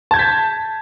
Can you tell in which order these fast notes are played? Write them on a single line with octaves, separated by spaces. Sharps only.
A5 G#6 G6 B6